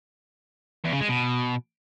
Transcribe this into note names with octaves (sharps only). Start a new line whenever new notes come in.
E2
C#3
G#3
B2